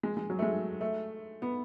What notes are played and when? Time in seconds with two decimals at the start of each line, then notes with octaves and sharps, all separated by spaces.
0.03 G#3
0.17 G#3
0.30 F#3
0.39 A3
0.42 G#3
0.81 A3
1.42 B3